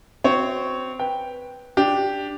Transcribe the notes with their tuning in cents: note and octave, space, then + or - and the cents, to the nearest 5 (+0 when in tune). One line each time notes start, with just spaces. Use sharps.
C4 -20 F#4 +0 C#5 +0
B4 -10 G5 +0
D4 +0 G4 +0